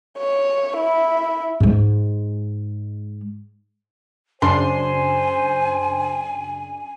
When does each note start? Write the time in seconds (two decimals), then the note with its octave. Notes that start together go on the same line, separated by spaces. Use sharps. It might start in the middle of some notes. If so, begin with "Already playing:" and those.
0.18 C#5
0.77 E4
1.60 G#2 G#3
4.42 F#2 C#3 D4 C5 G#5 C6